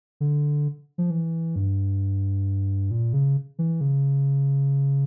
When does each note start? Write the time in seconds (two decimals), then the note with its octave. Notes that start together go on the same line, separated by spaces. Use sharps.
0.20 D3
0.98 F3
1.10 E3
1.56 G2
2.91 A#2
3.13 C#3
3.59 E3
3.81 C#3